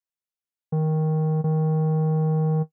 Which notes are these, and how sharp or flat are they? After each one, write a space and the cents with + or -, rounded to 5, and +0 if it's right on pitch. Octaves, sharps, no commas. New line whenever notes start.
D#3 +10
D#3 +15